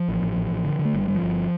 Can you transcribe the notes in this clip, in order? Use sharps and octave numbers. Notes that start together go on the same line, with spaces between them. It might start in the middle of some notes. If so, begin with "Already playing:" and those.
Already playing: F3
A1
A1
A1
A1
D3
D3
A3
G1 G3
G1 G3
F3
G1